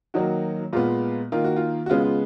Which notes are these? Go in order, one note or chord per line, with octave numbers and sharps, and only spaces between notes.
D#3 F#3 A#3 D#4 F#4
A#2 G#3 B3 F4
D#3 A#3 F4
F#4
F4
F#4
C#3 G#3 B3 F4
F4